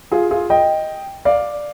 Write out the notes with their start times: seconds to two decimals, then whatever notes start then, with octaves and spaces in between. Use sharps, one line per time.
0.12 F4 G#4
0.31 F4 G#4
0.50 D#5 G5
1.25 D5 F5